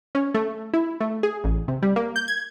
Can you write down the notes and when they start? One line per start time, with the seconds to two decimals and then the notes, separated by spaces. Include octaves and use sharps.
0.15 C#4
0.34 A3
0.74 E4
1.00 A3
1.23 G#4
1.44 A1
1.68 C3
1.82 G3
1.96 A#3
2.16 G6
2.28 G#6